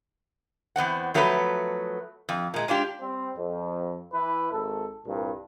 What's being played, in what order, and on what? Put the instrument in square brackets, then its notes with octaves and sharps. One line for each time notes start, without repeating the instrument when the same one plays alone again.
[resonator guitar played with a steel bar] E2 B3 C4 F#5
F3 F#3 A3 B3 A#4 B4
F2
A#2 G#3
G#3 D4 F4 G4
[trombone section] G3 C4
F2
E3 E4 B4
G#1 A4
C2 G2 A#2